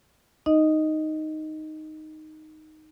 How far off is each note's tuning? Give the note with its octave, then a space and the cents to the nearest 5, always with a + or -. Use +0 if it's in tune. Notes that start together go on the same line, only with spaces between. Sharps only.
D#4 +0 D#5 +0